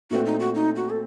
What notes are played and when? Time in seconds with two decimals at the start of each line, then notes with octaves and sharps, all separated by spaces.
0.11 A#2 A3 C4 F#4
0.25 D#4
0.40 F#4
0.55 D#4
0.76 F#4
0.90 A4